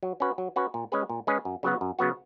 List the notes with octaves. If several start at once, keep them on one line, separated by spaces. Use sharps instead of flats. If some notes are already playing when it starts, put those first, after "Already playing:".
F#3
C#4 F#4 B4
F#3
C#4 F#4 B4
A#2
G#3 C#4 G#4 B4
A#2
G#3 C#4 G#4 B4
F#2
C#3 F#3 B3 F#4
F#2
C#3 F#3 B3 F#4